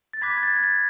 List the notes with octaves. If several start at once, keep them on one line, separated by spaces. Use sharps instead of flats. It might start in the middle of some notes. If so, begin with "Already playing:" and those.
A6
B5 D6 F#6 G#6 B6
G#6
A6
G#6
A6